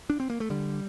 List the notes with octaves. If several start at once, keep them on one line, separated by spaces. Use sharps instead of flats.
D4
C4
A#3
A3
D3 G3